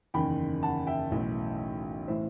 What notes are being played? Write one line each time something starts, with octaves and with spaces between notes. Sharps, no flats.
F#1 E2 D#3 G5 B5
F#5 A5
E5 G5
B1 A2 E3
A2 E3 C5 E5